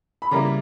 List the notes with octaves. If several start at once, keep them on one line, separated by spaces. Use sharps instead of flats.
B5
C#3 G3 A#3 E4 A#5